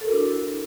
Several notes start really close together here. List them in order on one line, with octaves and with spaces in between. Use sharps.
A4 A#4 F#4 D4 E4